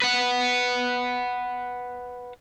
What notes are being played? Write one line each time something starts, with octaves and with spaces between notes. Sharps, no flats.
B4 F#5